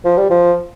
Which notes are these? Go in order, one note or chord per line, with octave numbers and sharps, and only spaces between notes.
F3
G3
F3